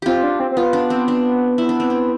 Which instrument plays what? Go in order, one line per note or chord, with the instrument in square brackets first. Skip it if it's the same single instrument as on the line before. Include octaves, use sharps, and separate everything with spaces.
[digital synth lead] C4 [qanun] F4 G4
[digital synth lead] D4
C4
C4
[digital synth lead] B3 [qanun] F4
[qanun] D4
C4
D4
E4
D4
C4
D4